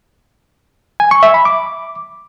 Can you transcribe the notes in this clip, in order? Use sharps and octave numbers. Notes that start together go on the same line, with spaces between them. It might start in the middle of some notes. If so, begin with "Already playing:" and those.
G#5
C#6
E5
B5
D6